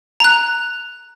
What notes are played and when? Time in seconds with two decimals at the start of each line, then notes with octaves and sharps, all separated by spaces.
0.20 A#5 F#6